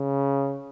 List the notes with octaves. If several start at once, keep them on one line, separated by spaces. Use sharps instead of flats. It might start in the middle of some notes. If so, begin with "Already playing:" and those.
Already playing: C#3